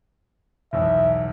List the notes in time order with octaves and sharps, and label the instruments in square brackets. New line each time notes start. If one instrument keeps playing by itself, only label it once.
[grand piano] B1 E2 [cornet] E5